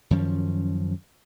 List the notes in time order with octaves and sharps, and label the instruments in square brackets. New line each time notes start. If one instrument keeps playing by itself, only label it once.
[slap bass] F#2 D#3 F3 C#4